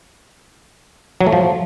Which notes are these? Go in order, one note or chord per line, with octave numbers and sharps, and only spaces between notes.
F#3
A3
F3